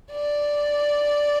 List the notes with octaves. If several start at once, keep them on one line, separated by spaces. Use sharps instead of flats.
D5